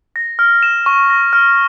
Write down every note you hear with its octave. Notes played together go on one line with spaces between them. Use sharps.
A#6
F6
E7
C#6
A#6
F6